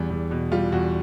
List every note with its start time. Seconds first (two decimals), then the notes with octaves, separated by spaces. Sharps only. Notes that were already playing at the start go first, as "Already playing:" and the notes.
Already playing: E2 G3
0.10 E2
0.31 B2
0.52 G3 F4
0.72 E2 F#4